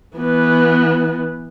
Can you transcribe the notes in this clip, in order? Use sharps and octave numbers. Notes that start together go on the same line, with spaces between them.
E3 B3